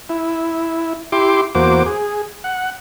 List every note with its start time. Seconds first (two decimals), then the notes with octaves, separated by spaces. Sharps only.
0.09 E4
1.12 E4 G4 C6 D6
1.55 E2 A#3 F#4 C5 D6
1.86 G#4
2.44 F#5